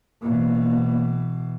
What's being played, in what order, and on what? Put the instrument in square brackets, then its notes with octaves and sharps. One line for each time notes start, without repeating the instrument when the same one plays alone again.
[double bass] B2 E3 [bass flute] A#3